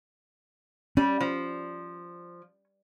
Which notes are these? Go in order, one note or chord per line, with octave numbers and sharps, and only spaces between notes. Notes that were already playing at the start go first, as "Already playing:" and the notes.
G3 C#4
F3